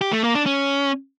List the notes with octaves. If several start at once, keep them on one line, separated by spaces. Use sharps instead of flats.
G4
A3
A#3
D4
C#4